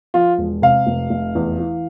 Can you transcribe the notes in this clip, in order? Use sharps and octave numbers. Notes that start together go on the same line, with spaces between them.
F3 F4
E1
C3 F5
F1
F1
E2
E3